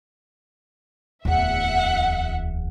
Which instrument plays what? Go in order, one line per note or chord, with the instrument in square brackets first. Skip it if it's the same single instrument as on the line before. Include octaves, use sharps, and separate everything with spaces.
[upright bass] D1 E2 [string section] E5 F#5